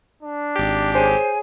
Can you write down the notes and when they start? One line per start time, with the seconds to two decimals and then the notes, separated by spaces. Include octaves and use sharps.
0.23 D4
0.56 G#1 G4
0.95 G#4 C5 C#5 G#5